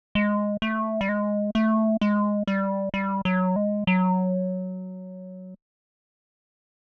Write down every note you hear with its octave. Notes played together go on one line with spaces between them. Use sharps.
G#3
A3
G3
G#3
A3
G#3
G3
G3
F#3
G#3
F#3